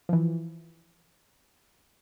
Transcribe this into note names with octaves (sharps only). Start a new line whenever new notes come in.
E3 F3